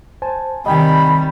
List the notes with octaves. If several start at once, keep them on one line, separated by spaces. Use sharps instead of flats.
C5 G#5 A5
C3 D#3 G3 D#5 G5 G#5 B5